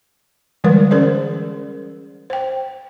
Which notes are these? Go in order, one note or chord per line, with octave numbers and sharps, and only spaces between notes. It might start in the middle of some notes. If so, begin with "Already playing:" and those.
D3 E3 G3 G#3 A#4 B4
C#4 G#4 A#4 C5 D5
C5 G5